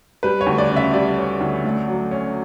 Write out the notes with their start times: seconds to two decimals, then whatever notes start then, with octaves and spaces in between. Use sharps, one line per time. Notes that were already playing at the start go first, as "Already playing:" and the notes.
0.23 G3 B4
0.41 C#5
0.46 D2
0.58 D5
0.70 C#3
0.76 E5
0.94 G3 D5
1.17 C#4
1.41 D2
1.64 A3
1.88 F#3
2.11 C#4